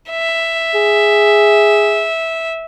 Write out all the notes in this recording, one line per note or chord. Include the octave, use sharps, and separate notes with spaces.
E5
G#4